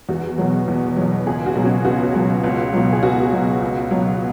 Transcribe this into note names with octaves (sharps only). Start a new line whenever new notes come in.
E2 F#4
B2 F#3
E2
F#3
B2
C#2 G#4
F#4
B2 F#3
C#4
C#2 F#4
B2 F#3
C#2
B2 F#3
G#4
C#2 F#4
B2 F#3
C#2
B2 F#3